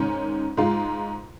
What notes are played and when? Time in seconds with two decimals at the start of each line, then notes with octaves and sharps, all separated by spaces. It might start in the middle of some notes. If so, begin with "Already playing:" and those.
Already playing: G#2 D#3 C#4
0.57 G#2 G#3 F4